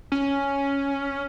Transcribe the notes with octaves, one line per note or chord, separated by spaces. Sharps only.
C#4